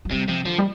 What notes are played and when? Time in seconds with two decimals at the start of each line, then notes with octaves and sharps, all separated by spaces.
0.05 F3
0.11 C3 G3
0.28 C3 F3
0.45 D3 F3
0.58 G3